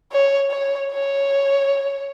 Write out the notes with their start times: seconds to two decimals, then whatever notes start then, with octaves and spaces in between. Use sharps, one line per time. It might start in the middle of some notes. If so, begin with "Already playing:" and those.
0.12 C#5
0.51 C#5
0.91 C#5